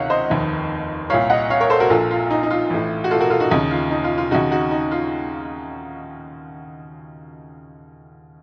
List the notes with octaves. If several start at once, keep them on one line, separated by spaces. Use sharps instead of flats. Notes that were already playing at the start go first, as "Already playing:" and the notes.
Already playing: C#2 C3 D#3 C#5 F5 F#5
C5 D#5
F1 D#2 D#3
C2 A#2 C#5 F5
D#5 F#5
C#5 F5
A#4 C#5
A4 C5
F#4 A#4
A#1 A#2 F4 A4
F4
D#4
D#4
F4
A1 A2
F#4
F4 A4
F#4 A#4
F4 A4
D#4 F#4
D#2 C#3 D#4
F4
D#4
F4
F4
D#2 C#3 D#4 F#4
D#4 F#4
D#4
F4